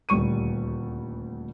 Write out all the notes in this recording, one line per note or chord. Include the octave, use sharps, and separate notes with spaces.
D#1 D2 G3 C#6 D#7